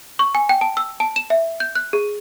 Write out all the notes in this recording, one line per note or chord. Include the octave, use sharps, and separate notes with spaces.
C#6
G#5
G5
A5
E6
A5
E7
E5
G6
F#6
G#4